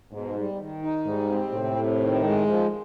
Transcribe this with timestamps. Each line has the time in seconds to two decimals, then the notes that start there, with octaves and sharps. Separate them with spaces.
0.11 G#2 B2
0.36 G3
0.58 D#3
0.82 D#4
1.05 G#2 G3
1.29 C4
1.52 A2 C3
1.76 C3
2.00 D#3
2.23 G#3
2.47 F3